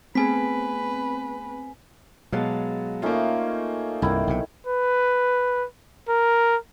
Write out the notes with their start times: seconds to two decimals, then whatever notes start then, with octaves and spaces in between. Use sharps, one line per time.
0.15 A3 B3 C4 G#4 B4 G#5 B6
2.32 B2 F#3 G#3 B3 F5 A5
3.02 A3 A#3 C#4 D#4 F4
4.02 C2 G2 D#3 E4
4.27 B1 C3
4.67 B4
6.09 A#4